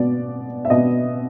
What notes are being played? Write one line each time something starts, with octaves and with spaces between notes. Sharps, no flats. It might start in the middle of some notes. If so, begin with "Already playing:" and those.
Already playing: B2 D5
E5
B2 D#5